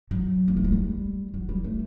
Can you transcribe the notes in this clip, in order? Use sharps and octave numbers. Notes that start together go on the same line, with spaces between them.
F#3
A#3
A3
G#3
G3
F#3
G3
A3